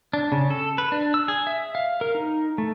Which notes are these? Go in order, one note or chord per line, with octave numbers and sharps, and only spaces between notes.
D4
C#3
A4
B4
D4
E6
G#4
E5
F5
A#4
D#4
A3